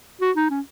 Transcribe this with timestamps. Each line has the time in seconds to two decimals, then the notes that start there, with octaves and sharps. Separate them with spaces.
0.21 F#4
0.36 D#4
0.50 C#4